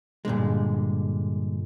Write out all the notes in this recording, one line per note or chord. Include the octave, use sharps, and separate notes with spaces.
G2 A#2 D3 G#3